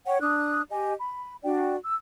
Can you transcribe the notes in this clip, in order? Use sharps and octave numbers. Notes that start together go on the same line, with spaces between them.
C#5 F#5 G5
D4 D#6 F#6
G4 D#5 G#5
B5
D4 F#4 D5 G5
E6